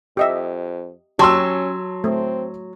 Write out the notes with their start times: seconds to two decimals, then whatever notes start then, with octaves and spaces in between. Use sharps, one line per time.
0.17 F2 G4 D#5 E5
1.19 F#3 C#4 G4 A5 C6 E6
2.04 A3 C4